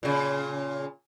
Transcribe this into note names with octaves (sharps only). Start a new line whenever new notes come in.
A#2 C#3